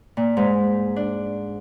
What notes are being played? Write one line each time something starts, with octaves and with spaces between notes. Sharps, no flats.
A#2
G#2
D4